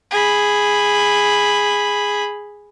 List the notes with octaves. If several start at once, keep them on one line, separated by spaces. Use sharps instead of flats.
G#4 B5